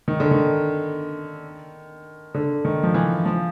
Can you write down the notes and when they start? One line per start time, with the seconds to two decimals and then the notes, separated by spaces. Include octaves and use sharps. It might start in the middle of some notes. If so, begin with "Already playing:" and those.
0.08 D#3
0.20 D3
0.31 D#3
2.34 D3
2.65 D#3
2.83 F3
2.94 E3
3.26 F3